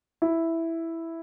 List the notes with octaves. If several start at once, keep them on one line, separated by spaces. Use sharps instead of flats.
E4